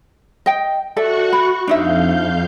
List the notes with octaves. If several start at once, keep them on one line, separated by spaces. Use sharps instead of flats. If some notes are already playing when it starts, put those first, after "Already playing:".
D#5 G5
F#4 A4 D5 E5 F#5 C#6
B5
F2 D4 D#4 E5 F5 G6